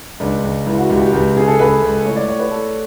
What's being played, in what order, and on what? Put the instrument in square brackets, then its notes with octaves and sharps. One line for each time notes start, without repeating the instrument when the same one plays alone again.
[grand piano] C#2 [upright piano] D4
[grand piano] C#2
[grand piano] C#2 [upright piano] E4
[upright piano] F#4
[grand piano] C#2 [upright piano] G4
[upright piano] G4
[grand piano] C#2 [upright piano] G4
[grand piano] C#3 [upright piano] G#4
[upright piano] A4
[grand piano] C#2 [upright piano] B4
[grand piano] C#2
[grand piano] A2 [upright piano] C#5
[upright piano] D5
[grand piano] A2 [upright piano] C#5
[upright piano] B4
[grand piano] A2 [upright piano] A4